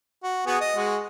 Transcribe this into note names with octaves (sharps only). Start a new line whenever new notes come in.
F#4
B3 F#4 G#4
D#5
G#3 F#4